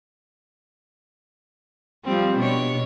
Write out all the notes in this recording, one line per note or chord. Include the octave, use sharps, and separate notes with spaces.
F3 G3 C4
B2 D4 C#5